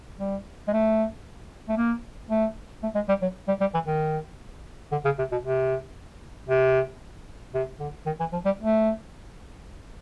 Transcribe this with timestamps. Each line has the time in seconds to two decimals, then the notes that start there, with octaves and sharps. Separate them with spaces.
0.20 G3
0.68 G#3
0.73 A3
1.69 A3
1.77 A#3
2.30 A3
2.83 A3
2.95 G#3
3.09 G3
3.22 F#3
3.48 G3
3.61 G3
3.74 E3
3.87 D#3
4.92 D3
5.05 C#3
5.19 C3
5.32 B2
5.44 C3
6.49 C3
7.54 C3
7.80 D3
8.06 D#3
8.20 E3
8.33 F3
8.46 G3
8.59 A3